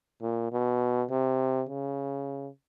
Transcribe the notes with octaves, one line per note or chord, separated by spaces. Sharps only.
A#2
B2
C3
C#3